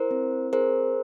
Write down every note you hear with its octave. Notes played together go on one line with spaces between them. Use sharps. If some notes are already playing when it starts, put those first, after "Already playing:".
Already playing: E4 A#4 C5
C4
G#4 A#4 C5